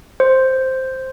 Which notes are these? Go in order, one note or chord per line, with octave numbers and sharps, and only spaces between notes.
C5